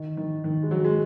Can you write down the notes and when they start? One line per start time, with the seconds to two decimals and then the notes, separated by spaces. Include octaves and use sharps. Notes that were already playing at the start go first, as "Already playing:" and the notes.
Already playing: D#3
0.17 D#3
0.44 D#3
0.63 G#3
0.71 F#3
0.84 G#3